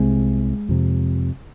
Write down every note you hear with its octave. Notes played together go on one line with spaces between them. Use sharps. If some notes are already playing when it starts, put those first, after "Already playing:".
Already playing: C2 C3 G#3
F2 C3